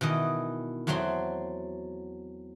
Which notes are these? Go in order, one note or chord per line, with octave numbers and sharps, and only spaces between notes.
B2 D#3 E3 D#5
E2 F#3 A3 C4 F#4 C6